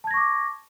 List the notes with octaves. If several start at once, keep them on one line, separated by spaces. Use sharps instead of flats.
A5 C#6 D6 G#6 A#6